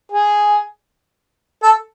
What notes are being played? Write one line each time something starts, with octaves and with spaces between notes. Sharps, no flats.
G#4
A4